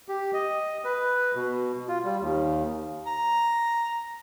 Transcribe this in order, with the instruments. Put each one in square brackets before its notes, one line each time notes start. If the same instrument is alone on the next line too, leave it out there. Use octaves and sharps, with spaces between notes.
[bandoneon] G4
D#5
B4
B2
F4
G3
D#2
[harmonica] A#5